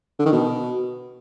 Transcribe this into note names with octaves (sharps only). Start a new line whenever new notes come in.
D3
D#3
B2